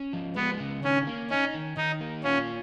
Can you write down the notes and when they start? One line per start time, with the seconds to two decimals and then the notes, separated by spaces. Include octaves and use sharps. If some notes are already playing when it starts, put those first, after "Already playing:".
Already playing: C#4
0.13 F3
0.36 G#3 B3
0.60 C#3
0.83 D#3 C#4
1.07 A#3
1.30 C#4 D#4
1.54 D#3
1.77 D#3 D#4
2.01 A#3
2.24 C#4 F4